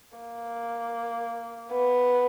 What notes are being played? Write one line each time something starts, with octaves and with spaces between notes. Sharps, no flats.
A#3
B3